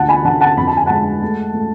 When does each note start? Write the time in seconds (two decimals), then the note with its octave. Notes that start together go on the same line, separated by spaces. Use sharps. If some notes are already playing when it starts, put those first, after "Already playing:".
Already playing: D2 D3 F#5 A5
0.09 G#5 B5
0.24 D3 F#5 A5
0.41 F#5 A5
0.57 F2 B5
0.68 A5
0.77 G#5
0.86 G#3 F#5 A5
1.23 A3
1.54 A3